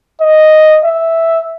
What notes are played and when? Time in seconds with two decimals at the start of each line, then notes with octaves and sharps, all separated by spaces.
0.21 D#5
0.84 E5